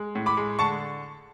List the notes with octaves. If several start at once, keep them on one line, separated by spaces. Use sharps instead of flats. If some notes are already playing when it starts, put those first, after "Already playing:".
Already playing: G#3
A2
B5 D6
G#3
D3 A5 C#6